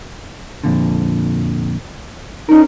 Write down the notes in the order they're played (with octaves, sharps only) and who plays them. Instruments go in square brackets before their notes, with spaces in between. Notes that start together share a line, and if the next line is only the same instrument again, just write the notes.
[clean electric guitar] F2 A#2 D3
[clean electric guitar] C#4 A#4 [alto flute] D#4